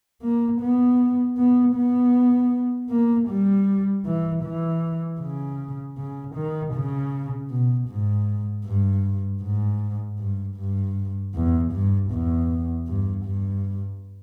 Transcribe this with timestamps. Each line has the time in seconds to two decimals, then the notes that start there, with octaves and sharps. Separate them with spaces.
0.22 A#3
0.61 B3
1.37 B3
1.76 B3
2.90 A#3
3.29 G3
4.06 E3
4.44 E3
5.21 C#3
5.98 C#3
6.35 D#3
6.74 C#3
7.51 B2
7.89 G#2
8.65 G2
9.42 G#2
10.19 G2
10.57 G2
11.34 E2
11.72 G2
12.11 E2
12.88 G2
13.25 G2